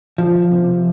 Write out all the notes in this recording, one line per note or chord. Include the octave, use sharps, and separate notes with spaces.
F3
C3